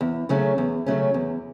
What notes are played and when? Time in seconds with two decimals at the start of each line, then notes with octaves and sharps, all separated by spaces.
0.01 E2
0.29 C#3 F#3 A3 C#4
0.58 E2
0.86 C#3 F#3 A3 C#4
1.14 E2